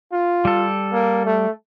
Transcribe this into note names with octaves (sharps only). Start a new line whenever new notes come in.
F4
G3 A4
A#3
A3